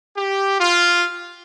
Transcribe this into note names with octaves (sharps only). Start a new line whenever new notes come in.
G4
F4